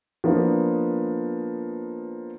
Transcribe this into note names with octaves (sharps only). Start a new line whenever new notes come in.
F3 A#3 B3 D4